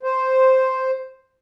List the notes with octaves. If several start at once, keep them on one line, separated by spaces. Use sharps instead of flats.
C5